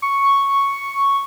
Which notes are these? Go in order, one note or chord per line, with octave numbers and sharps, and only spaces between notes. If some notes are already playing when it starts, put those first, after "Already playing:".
C#6